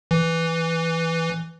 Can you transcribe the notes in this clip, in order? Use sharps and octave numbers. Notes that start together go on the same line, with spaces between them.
E3